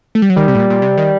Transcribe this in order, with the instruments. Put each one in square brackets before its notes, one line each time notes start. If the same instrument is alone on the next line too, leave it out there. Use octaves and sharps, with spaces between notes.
[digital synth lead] A3
G3
F#3
[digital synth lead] D#3 [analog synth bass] G3
[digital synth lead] C3
A2
A#2
A#2
C3
D#3